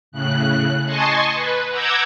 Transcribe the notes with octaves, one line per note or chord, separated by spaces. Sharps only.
A2 C#3 F#6
D#5 G#5 A5 C6 C#6
B4
F#5 A#5 D6 E6 G6 G#6